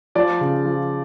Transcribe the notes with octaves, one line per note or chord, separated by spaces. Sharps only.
F3 D5
C#3
F3